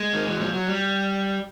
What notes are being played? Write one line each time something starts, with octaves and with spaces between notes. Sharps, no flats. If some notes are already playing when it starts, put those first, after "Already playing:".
Already playing: G#3
D#3
E3
F3
F#3
G3